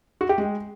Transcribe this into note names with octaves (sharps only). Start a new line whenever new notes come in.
F#4
G4
G#3